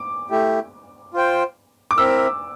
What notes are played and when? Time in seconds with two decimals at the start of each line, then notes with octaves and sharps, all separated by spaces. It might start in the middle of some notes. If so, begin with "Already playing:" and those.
Already playing: D6
0.30 A3 E4 G4
1.14 F4 C5 G5
1.91 D6
1.97 C4 E4 A#4 E5 E6